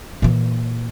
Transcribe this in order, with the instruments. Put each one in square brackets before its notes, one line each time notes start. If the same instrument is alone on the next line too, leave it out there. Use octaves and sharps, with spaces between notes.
[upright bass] A#2 E3